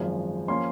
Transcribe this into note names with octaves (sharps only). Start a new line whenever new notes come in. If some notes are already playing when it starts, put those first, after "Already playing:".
Already playing: G#1 F#2 F3 G#3
F3 A#3 C#4 C6